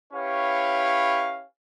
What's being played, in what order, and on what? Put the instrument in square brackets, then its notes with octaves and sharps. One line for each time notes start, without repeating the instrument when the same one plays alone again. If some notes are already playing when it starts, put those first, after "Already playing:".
[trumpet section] C#4 E4 G4 B4 C#5 F5